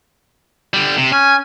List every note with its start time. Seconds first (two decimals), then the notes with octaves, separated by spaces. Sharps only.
0.74 D3 G3
0.98 C3
1.12 C#4 G#5